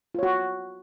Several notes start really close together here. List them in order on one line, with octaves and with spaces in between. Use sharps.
F4 C#5 F#4